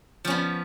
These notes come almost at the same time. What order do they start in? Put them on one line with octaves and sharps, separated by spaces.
F3 C#4 B3